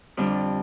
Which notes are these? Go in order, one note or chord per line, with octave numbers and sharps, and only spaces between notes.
F2 D3 G3 D4